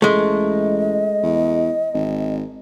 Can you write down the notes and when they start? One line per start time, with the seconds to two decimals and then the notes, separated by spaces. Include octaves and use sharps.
0.02 A1 G#3 A3 D#5
1.23 E2
1.94 G#1